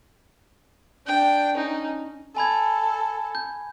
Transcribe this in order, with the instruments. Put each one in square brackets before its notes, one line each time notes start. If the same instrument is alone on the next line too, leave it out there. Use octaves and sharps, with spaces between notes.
[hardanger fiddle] D4 G5
C#4 D#4
[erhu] A4 [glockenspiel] G#5 B5 G#6
[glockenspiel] G6